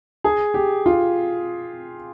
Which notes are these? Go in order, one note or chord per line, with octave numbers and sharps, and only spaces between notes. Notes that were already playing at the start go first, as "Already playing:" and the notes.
G#4
G4
F4